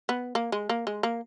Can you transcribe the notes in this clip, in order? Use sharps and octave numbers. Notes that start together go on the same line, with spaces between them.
B3
A#3
G#3
A#3
G#3
A#3